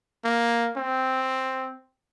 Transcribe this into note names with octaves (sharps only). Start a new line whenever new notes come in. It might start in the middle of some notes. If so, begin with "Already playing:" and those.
A#3
C4